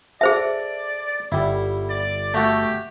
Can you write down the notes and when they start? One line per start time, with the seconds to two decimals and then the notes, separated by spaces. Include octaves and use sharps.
0.21 G#4 A4 C5 D5 E5
1.32 G1 G3 E4
1.90 D5
2.34 A3 F#4 G4 A4